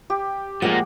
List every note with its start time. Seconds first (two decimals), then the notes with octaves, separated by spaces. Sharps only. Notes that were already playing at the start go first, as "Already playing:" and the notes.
0.10 G4
0.62 A#2 F3 G#3 A#3 F#5